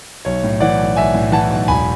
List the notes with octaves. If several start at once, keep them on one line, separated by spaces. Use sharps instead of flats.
B1 C#5
A2
E3 D5 F#5
B1
B1 E5 G#5
A2
E3 F#5 A5
B1
E1 G#5 B5